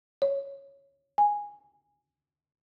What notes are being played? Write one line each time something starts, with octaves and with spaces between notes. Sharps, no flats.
C#5
G#5